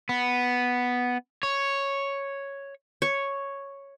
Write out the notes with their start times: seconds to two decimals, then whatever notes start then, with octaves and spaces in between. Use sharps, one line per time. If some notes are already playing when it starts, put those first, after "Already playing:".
0.09 B3
1.43 C#5
3.02 C#5